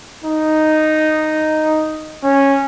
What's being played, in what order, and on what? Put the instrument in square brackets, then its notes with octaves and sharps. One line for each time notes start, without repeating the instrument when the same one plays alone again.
[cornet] D#4
C#4